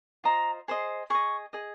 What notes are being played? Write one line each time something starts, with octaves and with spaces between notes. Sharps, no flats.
F4 C5 D#5 A#5
G#4 C5 D#5
G#4 D#5 C#6
G#4 D#5